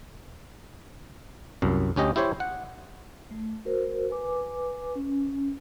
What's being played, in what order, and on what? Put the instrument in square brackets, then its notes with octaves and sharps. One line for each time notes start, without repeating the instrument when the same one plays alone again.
[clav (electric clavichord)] C2 F#2
D2 C#4 G4 D#5
E4 G4 C5 C#5
F#5
[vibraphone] A3
F#4 A#4 C5
B4 G#5 D6
C#4